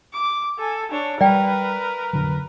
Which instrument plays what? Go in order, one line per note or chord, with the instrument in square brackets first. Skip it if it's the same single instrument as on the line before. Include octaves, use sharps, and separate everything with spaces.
[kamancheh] D6
A4 G#5
D4 C#5
[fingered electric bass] G3 [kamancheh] A#4 B4 [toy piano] D5 G5
[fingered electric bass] F2 D3 F#3